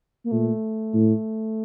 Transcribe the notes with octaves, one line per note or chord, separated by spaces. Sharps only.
A#3
A#2 A3
A2